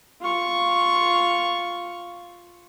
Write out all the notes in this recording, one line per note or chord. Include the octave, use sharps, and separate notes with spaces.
F4 C#6